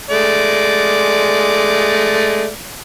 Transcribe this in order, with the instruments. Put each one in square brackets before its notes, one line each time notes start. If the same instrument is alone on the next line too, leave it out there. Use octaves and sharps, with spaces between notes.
[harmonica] G#3 A3 D5